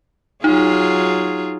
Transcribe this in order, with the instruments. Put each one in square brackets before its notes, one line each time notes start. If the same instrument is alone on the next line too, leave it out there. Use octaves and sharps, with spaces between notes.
[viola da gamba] F#3 F4 G#4 [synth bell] D#4